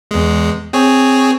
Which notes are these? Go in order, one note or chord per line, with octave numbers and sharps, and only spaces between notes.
E2 G#3
C4 G#4 C#5